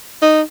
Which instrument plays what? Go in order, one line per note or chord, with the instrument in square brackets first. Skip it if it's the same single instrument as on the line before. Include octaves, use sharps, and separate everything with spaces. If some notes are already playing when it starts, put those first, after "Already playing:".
[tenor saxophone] D#4